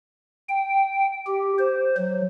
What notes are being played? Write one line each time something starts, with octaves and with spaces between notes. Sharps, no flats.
G5
G4
C5
F#3